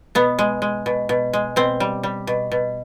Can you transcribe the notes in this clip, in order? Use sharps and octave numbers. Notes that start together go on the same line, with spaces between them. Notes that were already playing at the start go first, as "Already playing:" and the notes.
B2 B3
G#3
G#3
B2
B2
G#3
B2 C4
G3
G3
B2
B2